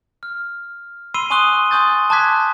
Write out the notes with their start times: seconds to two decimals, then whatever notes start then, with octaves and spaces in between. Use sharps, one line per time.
0.23 F6
1.14 B5 C6 E6 C7 D#7 G7
1.30 G#5 C6 C#6 D#6 F#6 G7
1.71 G#5 C6 C#6 D#6 G6 A6
2.10 A5 C6 D6 F#6 G#6 B6